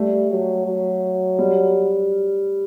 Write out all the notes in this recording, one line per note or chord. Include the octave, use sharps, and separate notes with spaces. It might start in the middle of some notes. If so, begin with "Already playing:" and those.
Already playing: G3 A3
F#3
F#3
G3